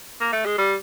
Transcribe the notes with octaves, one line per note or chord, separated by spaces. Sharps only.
A#3
A3
G#3
G3